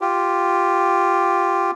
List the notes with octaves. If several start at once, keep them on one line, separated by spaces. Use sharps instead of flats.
F4 G4